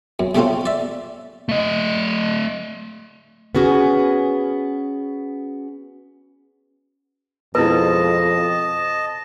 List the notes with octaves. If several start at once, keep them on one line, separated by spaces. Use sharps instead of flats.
F#2
C3 G3 A3 C4 C#4 F4
D5 E5
A3 D#5
B3 C#4 F#4 G#4
F2 B2 G#3 E4 B4 D#5 A5